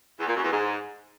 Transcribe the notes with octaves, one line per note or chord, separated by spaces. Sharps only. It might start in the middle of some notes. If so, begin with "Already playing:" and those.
E2
A#2
F#2
E2
G#2